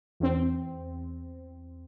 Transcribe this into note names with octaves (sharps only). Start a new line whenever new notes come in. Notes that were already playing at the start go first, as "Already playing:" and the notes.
E2 C4